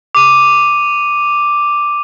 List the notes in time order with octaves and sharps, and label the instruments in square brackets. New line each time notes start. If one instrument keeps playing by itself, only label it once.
[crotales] D6 D#7